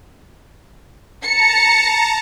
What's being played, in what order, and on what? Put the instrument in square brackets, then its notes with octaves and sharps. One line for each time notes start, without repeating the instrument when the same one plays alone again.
[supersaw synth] A5 A#5 [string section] C#7